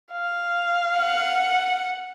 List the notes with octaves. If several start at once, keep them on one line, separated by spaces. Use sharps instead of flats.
F5
F#5